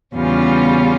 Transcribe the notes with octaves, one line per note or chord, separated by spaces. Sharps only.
E2 C#3 G3 C#4 F4